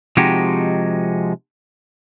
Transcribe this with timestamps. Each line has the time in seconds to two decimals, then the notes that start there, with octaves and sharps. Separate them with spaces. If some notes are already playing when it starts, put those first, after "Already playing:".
0.17 C3 F3 G#3 D#4 F#4 G4